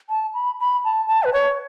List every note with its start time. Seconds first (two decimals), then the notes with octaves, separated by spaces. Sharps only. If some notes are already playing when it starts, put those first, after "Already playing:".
0.09 A5
0.34 B5
0.60 B5
0.84 A5
1.08 A5
1.24 B4
1.33 C#5